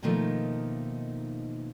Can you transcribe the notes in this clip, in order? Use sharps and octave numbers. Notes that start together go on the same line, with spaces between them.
B2 D#3 F3 A3 A#3 D#4